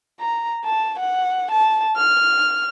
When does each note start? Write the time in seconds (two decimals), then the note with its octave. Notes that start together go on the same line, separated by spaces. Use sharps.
0.20 A#5
0.65 A5
1.00 F#5
1.52 A5
1.97 F6